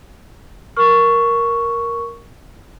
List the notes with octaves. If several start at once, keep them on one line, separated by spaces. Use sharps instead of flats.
A#4 C#6 F6